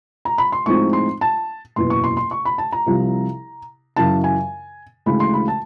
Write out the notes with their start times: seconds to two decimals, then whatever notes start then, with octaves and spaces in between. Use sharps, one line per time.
0.25 A#5
0.38 B5
0.52 C6
0.66 A2 F3 G#3 C4 D#4 C#6
0.93 C6
1.21 A5
1.76 F#1 E2 B2 C6
1.90 C#6
2.04 C6
2.17 C6
2.31 C#6
2.45 B5
2.58 A5
2.72 A#5
2.86 C2 C3 F3
3.96 F#2 C#3 E3 A5
4.24 G#5
5.06 D2 C#3 E3 G#3 B5
5.20 C6
5.34 B5
5.48 A5